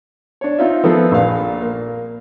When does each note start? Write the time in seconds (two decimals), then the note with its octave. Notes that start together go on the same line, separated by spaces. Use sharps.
0.41 D4 C#5
0.58 C4 D#4 F4 E5
0.84 F3 B3 C4 A4 A#4
1.11 A#1 A#2 F5
1.62 A#3